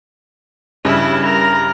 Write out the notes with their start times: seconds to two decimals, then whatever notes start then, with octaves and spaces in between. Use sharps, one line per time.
0.85 G2 C#3 E4
1.24 A#4